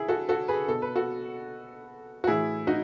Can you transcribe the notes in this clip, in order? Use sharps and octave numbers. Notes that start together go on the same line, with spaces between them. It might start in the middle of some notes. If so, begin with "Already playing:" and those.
Already playing: E4 G#4
F#4 A4
F#4 A4
G#4 B4
B2 A4
B4
F#4 A4
F#4
A2 E3 E4 G#4
D#4 F#4